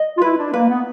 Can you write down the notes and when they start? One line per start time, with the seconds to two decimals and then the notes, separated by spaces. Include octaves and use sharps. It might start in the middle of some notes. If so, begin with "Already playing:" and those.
Already playing: D#5
0.18 F4
0.22 E4 B4
0.38 D4
0.53 A#3 B4
0.69 B3